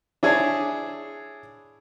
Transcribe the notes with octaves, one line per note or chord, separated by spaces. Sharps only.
D4 E4 G#4 C#5 G#5 A5